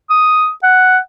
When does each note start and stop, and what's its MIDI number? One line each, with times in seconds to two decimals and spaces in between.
0.10 0.50 87
0.63 0.98 78